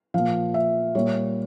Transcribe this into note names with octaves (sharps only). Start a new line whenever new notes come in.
A#2 F3 F5
E5
A#2 G3 C#5